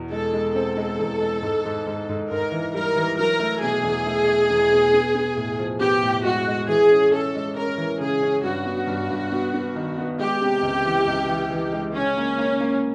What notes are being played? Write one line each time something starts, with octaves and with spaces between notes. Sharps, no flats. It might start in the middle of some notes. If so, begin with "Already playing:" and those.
Already playing: E2 B2
G#3 A4
G#3
C4 A4
G#3
E2
G#3
G#2
G#2
G#2
G#2
G#2 A#4
E3
G3 A#4
E3
F#3 A#4
A3
B2 G#4
E2
A3
A3
E2
B2
B3
B3
A2
F3
B3 G4
A2
G#3 F#4
G#3
E3 G#4
C#4
C#4 A4
G#3
C#4 A#4
E3
C#3 G#4
C#4
G2 F#4
B3
G2
G2
B3
B3
D#3
B3
G#3 G4
C3
C#2
E3
C#2
E3
E3
G#3
C#3 C#4
A#3
A#3
A#3